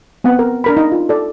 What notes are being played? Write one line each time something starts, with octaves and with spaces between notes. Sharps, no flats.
B3 C4 F#5
A#4
D4 A#4 B5
D#4
F4
A4 D5